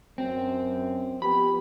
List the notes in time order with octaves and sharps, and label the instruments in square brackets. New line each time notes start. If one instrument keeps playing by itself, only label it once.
[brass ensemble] F#2 [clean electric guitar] C4
[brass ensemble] F3 B3 G4 [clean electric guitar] B5